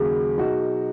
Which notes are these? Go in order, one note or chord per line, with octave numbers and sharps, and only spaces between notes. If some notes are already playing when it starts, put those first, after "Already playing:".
Already playing: D#2 C#3 F#3 G#4
B2 F#3 D#4 F#4